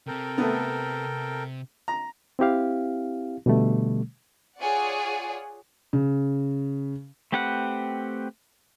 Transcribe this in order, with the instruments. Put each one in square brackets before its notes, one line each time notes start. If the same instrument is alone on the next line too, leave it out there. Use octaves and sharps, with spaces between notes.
[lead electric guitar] C3 C4 [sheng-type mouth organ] A4 A#4 G5
[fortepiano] A3 B3
A#5
[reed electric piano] C4 E4 G4 F5
B2 D3 G3 A3
[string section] F4 G#4 C#5 D5 F#5
[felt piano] C#3
[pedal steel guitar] A3 C4 G4 B4 F#5